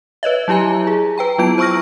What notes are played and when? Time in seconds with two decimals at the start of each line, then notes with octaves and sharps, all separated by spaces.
0.23 B4 C#5 D#5 E5
0.48 F#3 E4 G4 G#5 A#5
0.87 G#4
1.18 B4 G5 A#5
1.38 F#3 B3 E4 F4 D7
1.58 C5 A#5 C#6 E6 F6 A#6